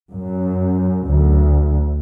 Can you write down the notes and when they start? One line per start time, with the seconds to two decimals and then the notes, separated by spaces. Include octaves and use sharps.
0.15 F#2
1.08 D2